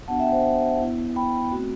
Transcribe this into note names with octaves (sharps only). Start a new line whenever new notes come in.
B3 D4 F#4 F#5 A5
E5 G5
C5 E5
B3 E4
G5 B5
A3 C4 F#4